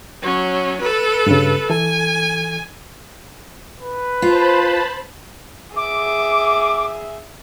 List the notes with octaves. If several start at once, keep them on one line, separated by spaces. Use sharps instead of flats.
F#3 C#4
A4 B4
G2 C#3
E3 A4 G#5
B4
F4 C5 A5 B5
G#4 E5 D6